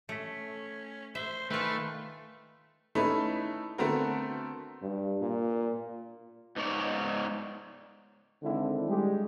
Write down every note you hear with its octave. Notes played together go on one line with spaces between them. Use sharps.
A3 C#4 B6 C#7
C5 E5
D#3 A3 F4 B4 G#5 B5
A3 C#4 D#4 E4 B4
D3 A3 B3 C4 F#4 A#4
G2
A#2
G#2 B3 D#4 C#5 D5
D3 D#3 G#3 C4 D4 E4
G3 G#3 G4